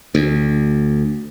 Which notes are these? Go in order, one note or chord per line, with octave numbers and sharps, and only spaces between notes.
D2